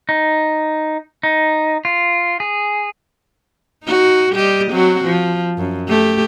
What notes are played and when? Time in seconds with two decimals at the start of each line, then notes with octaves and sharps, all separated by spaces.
0.09 D#4
1.23 D#4
1.85 F4
2.40 G#4
3.84 D#4 F#4
4.34 G3 G4 D#5
4.71 F#3 C4 F#4
5.04 F3
5.58 F#2
5.88 A3 G4